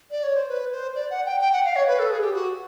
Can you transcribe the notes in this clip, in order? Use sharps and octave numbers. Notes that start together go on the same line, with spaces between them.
D5
C#5
C5
B4
C5
D5
F#5
G5
G5
F#5
F5
C#5
B4
A4
G#4
G4
F#4